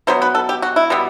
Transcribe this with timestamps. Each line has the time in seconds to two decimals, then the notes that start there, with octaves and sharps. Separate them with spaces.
0.07 B2 F#3 B3 C5
0.22 B4
0.35 A4
0.49 G4
0.62 F#4
0.76 E4
0.90 B2 G3 B3